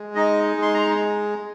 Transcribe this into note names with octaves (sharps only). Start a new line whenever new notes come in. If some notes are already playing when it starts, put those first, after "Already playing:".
Already playing: G#3
D#4 D#5
G#3
C6
A#5